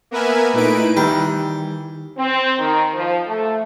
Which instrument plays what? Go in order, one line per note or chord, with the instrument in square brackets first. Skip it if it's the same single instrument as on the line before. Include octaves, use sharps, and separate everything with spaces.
[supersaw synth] A#3 B3 A#4 B4 E5 G#5
A#2 A3 D#4 E4 B4 D7
[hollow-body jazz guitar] D#3 E3 [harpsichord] G3
[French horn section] C4
D#3
F3
A3